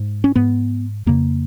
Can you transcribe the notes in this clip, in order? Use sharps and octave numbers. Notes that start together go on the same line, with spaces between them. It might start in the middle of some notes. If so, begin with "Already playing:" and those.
Already playing: G#2
C#4
G#2 B3
F2 C#3 A#3